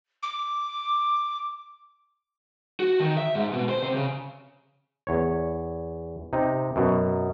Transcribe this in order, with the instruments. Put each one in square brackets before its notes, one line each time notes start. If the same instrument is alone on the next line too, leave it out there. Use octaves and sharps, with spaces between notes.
[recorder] D6
[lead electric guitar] F#4
D#3
E5
G#2
B2
C5
C3
C#3
[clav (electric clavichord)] E2 C#5
C3 D#4
F#2 B2